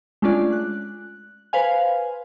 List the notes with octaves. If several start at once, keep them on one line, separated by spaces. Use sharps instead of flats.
G#3 A3 C#4 D4 F4 D5
F#6
B4 C5 F5 G#5